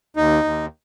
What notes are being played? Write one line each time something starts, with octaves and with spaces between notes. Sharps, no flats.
D#2 D#4
D#2